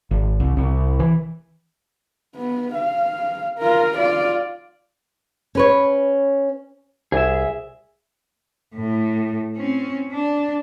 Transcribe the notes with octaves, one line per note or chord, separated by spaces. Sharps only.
G#1
C2
C2
E3
B3
F5
F4 A#4
F4 D5
C#4 B4 C#5
C2 G#4 E5
A2
C4 C#4
D4